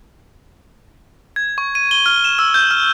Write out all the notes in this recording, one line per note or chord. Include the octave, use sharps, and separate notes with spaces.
G#6
C#6
D#7
G7
F6
E7
E6
G6
F6